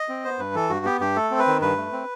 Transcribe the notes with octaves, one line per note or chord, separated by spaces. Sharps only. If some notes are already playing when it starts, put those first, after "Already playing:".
Already playing: D#5
C4
B3 C5
G2 B4
E3 A4
G2 F#4
B3 G4
G2 G4
A3 A4
C4
B4
D#3
G2 B4
A3
C4